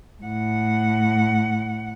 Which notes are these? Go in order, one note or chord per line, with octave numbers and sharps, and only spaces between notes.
A2 F#5